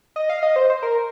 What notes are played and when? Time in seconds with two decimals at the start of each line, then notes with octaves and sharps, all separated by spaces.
0.16 D#5
0.29 F5
0.43 D#5
0.56 C5
0.70 C5
0.83 A#4